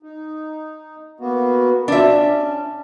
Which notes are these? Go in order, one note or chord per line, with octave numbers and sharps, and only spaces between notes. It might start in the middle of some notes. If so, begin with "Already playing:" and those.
D#4
A#3 B3 F#4
B2 F3 D4 E5
C#4